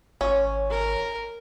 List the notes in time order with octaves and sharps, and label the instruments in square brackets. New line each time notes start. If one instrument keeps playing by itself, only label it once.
[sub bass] G#1 [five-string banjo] C#4 [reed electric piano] C#5
[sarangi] A#4